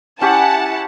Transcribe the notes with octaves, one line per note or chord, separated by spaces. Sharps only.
C#4 E4 G4 F#5 A5